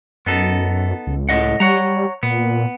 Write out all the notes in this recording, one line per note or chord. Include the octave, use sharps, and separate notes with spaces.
F#2 B3 D#4 A4
C#2
A2 D#5 F#5
G3 C#5 F#5 A#5
A#2 B3